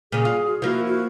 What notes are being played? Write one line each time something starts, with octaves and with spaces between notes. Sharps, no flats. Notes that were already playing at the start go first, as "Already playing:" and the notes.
A#2 C#3 G#4
F4
F#4
F3 A#3 E4 F#4
F#4